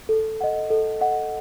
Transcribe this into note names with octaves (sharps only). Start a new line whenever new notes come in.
A4
D#5 F#5
A4
D#5 F#5